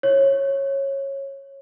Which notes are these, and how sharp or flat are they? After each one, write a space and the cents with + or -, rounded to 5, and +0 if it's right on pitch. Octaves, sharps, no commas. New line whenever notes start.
C#5 -15